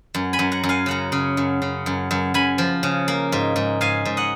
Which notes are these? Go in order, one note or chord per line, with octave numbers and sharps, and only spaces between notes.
F#2
G#5 B5
F#2
F#5 A#5
F#2
F5 G#5
C#3 F#5 A#5
C#3
F#2
C#3
F#2
F#2
F#2 G#5 B5
F3
C#3
A#3
G#2
G#2
G#2 F5 G#5
G#2
D#5 F#5